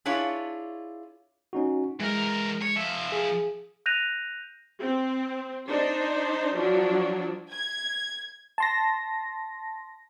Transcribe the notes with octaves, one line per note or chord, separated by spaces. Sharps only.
D4 E4 F4 G#4 C#5
C#4 D#4 F#4
E3 G#3 A#4
C#5
F3 E5
G#4
F#6 G6 A#6 D#7 F7
C4
D4 D#4 C5
F3 F#3 D4
G#6
A5 C6 A#6